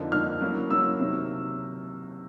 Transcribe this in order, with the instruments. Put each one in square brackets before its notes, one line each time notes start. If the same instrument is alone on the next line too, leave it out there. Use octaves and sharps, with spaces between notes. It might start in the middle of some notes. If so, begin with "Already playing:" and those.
Already playing: [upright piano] F2 D3 F3 A#3 D#4
[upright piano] F2 D3 F3 A#3 D#4 [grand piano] F6
[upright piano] F#3 A#3 C#4 E4
[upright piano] F#3 A#3 C#4 E4 [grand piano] E6
[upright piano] C3 D#3 F#3